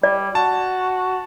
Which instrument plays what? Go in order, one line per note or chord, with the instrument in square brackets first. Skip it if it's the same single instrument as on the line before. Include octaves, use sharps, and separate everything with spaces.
[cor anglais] G3 [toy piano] D5
[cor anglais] F#4 [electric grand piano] A5